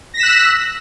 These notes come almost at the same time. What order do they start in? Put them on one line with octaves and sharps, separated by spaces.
A#6 B6 E7 F#6 E6